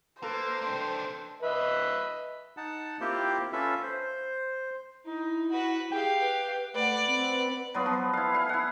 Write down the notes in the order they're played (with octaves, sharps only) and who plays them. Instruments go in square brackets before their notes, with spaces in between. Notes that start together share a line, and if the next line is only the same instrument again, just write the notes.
[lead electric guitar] A#3 [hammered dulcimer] A4 B4 [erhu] C5
[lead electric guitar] C4 D4
[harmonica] B4 D#5 E5
[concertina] D#4 F#5 A5
A#3 C4 E4 F4 G4 C5
C#4 F4 A4 B4 E5
C5
[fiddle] D#4 [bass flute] E4
[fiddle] F#4 B4
[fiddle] G4 F5 [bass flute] G#4 [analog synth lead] G5
[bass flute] B4
[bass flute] A3 [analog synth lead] B4 [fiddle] D5 F#5
[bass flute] C4
[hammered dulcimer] F#3 B3 F4
F3
E4 F5
F5 G#5
E4 F#5